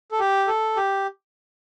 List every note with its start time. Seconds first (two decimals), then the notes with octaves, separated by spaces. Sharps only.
0.12 A4
0.19 G4
0.47 A4
0.77 G4